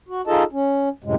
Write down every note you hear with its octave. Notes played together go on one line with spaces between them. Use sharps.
F#4
D#4 F4 G#4 A4 D#5 A5
C#4
F#2 A2 C3 G#3